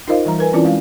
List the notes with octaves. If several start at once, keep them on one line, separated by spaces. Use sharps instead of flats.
D#4 F4 A#4 C5 D#5 F5
E3 G3 A#5
A#4 B4 G#5
E3 C4 C#4 E4 F4 D5
G#3 F5